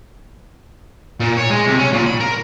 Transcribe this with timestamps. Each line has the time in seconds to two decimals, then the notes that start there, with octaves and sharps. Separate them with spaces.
1.20 A#2
1.37 C#5
1.50 G#3
1.66 C3
1.79 C#4
1.93 A#2
2.07 B5
2.20 A#4